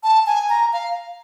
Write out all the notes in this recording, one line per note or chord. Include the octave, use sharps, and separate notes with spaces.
A5
G#5
A#5
F5